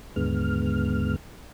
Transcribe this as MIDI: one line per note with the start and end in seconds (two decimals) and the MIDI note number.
0.16 1.16 39
0.16 1.16 44
0.16 1.16 50
0.16 1.16 56
0.16 1.16 59
0.16 1.16 89